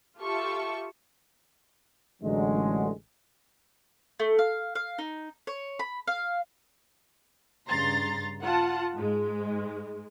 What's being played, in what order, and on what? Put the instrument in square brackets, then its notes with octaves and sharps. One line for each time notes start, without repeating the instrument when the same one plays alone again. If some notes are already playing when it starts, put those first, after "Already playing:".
[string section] F4 G4 A4 E5 C#6
[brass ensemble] A1 D3 F#3 G#3
[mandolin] A3
F5
F5
D#4
C#5
B5
F5
[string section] G2 C#3 A#5 C6 A6
F4 F#5 A5
G#2 G#3